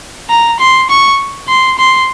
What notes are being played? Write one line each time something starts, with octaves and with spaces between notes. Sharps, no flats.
A#5
C6
C#6
C6
C6